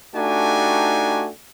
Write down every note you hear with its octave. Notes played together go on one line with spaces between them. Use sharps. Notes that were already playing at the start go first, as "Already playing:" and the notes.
A3 D4 D#4 F#4 G4 G#5